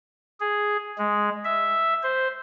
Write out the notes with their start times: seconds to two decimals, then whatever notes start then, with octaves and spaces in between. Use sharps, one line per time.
0.40 G#4
0.98 G#3
1.44 E5
2.03 C5